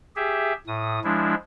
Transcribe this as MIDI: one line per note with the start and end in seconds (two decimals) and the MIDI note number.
0.16 0.53 67
0.16 0.53 68
0.16 0.53 76
0.67 1.00 45
0.67 1.00 87
1.04 1.34 53
1.04 1.34 56
1.04 1.34 62
1.04 1.34 64